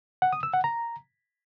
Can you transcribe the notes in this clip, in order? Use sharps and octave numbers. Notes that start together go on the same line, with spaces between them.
F#5
D#6
E6
F#5
A#5